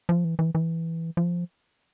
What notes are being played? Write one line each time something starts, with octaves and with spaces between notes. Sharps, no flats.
F3
E3
E3
E3
F3